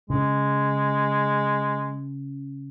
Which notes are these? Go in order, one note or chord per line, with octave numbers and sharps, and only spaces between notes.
C#3 G#3